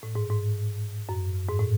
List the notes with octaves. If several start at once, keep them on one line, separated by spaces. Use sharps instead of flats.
A2
G#2
G#2
F#2
G#2
A2